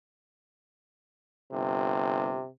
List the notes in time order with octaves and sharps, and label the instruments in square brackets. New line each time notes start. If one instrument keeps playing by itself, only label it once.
[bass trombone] G1 [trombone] C3